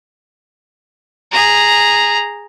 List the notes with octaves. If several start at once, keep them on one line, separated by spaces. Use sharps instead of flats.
G#4 A#5